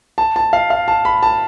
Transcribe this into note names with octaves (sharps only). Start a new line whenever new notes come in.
A5
A5
F5
F5
A5
B5
A5